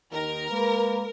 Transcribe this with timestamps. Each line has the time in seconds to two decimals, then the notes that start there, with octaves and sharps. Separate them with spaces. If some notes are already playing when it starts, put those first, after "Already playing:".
0.12 D#2 D#3 A#4
0.51 G#3 A#3 B4